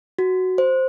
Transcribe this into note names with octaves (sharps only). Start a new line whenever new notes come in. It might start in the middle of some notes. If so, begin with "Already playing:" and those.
F#4
C5